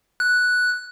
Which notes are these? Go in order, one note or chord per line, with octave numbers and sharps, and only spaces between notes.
F#6